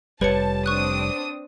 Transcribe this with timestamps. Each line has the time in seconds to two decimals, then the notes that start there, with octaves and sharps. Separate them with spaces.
0.21 F1 D#2 G3 B4 C#5 A5 C#7
0.66 C4 D4 C#6 D#6 F#6